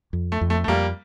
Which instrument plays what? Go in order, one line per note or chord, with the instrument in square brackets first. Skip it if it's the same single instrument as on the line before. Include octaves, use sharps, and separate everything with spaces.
[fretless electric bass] F2
[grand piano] A3
[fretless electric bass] F2
[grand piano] A3
A3
[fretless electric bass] F2 [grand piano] G3 A#3